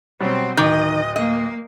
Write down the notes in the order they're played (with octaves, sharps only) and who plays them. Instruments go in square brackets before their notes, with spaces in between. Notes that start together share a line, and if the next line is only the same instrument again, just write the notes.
[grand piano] B2 F#3 G3 [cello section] C4
[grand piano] D1 D6 G6 [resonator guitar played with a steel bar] D#3 [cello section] D#5
[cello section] A#3 [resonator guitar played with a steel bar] D#5